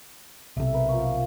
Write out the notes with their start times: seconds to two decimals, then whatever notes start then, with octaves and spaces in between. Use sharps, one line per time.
0.57 B1 C3 A3 E5
0.74 A#4 B4
0.89 F3 A#3 C#6